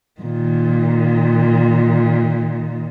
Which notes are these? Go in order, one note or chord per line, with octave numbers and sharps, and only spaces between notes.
A#2 D#3